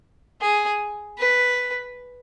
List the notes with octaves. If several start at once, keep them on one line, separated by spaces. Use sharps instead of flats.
G#4
B4